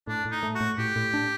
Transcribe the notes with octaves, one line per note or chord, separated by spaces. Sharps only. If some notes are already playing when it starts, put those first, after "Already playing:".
A2 D4
A2
D#4
A3
F#4
A2
A2 G4
A2
D4